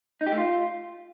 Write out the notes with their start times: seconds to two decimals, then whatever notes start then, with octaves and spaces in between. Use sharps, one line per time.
0.21 D#4
0.26 G4
0.32 A3
0.38 F4